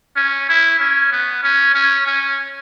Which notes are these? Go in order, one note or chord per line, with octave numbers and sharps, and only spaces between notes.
C#4
E4
C#4
B3
C#4
C#4
C#4